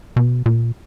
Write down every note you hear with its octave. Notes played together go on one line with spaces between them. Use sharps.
B2
A#2